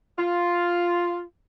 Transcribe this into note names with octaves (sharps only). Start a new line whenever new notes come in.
F4